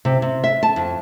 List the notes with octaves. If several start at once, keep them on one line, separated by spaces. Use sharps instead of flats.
C3
C3
E5
A5
F2